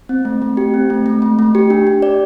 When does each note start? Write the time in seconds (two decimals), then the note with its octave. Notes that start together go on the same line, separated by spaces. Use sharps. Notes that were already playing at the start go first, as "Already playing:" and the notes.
0.09 C4
0.25 A3
0.42 A3
0.57 G4
0.74 C4
0.90 A3
1.06 A3
1.22 A3
1.39 A3
1.55 G4
1.70 D4
1.87 G4
2.02 D5